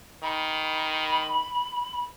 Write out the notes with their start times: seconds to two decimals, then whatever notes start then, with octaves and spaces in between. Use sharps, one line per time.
0.23 D#3 B5